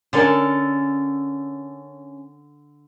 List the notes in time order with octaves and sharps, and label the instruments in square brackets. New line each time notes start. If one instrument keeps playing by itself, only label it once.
[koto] D3 A4 [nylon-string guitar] C#4 A#4 G#5